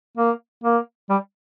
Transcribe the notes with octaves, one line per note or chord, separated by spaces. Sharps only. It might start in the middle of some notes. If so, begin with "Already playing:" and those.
A#3
A#3
G3